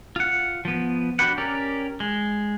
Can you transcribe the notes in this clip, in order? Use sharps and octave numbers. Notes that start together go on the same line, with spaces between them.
F4 F#5
F3 B3
D4 F#4 G4 B4 F#5
C#4 G4 A#4 D5
G#3